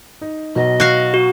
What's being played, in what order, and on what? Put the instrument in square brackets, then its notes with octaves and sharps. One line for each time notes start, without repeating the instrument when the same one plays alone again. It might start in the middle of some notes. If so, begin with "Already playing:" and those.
[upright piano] D#4
[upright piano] B1 B2 F#3 [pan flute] D#5
[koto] F#4 F5
[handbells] F#4